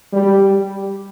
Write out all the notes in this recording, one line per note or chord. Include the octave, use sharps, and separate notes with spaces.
G3